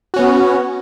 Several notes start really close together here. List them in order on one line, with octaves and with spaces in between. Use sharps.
F#4 C#4 B3